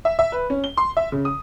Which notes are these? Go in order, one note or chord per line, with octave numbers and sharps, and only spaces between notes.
E5
E5
B4
C#4
G7
C6
E5
C#3
D#6